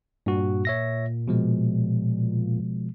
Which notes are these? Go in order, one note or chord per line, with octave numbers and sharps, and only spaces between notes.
G2 A#2 F#4
C#5 E5 A#6
B2 F3 G#3